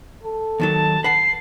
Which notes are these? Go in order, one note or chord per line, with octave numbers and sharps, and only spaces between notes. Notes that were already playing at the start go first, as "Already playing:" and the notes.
A4
D#2 D#3 F#3 A5
B4 F#5 A5 C7